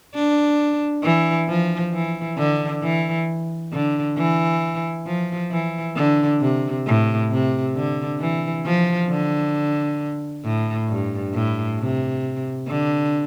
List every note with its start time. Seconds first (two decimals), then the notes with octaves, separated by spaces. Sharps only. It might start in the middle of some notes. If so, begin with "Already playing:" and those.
0.15 D4
1.04 E3
1.49 F3
1.94 E3
2.38 D3
2.82 E3
3.73 D3
4.17 E3
5.06 F3
5.51 E3
5.96 D3
6.41 C3
6.87 A2
7.31 C3
7.75 D3
8.20 E3
8.66 F3
9.10 D3
10.44 A2
10.89 G2
11.34 A2
11.79 C3
12.68 D3